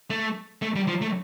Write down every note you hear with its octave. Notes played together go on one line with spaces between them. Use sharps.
A3
A3
G3
F3
A3